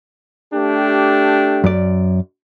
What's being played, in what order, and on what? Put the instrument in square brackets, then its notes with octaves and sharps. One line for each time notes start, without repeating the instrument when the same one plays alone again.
[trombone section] A3 D4 G4
[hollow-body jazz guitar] F#2 D5